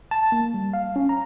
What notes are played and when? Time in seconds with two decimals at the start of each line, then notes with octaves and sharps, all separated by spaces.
0.11 A5
0.32 A#3
0.54 G3
0.73 F5
0.96 C#4
1.09 A#5